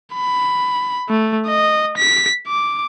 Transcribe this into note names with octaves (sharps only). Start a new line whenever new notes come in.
B5
A3
D#5
B6
D6